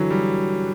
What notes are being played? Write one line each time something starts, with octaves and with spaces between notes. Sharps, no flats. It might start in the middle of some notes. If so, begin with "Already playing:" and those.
Already playing: D3 E3 F#3
G3